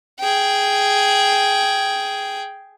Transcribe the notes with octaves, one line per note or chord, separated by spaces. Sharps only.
G#4 G5